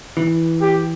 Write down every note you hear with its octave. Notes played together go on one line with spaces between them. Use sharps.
E3
G4